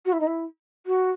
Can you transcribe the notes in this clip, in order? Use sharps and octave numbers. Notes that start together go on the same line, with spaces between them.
F#4
E4
D#4
E4
F#4